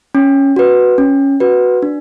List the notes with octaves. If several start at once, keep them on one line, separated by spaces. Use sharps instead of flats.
C#4
F#4 B4
C#4
F#4 B4
D4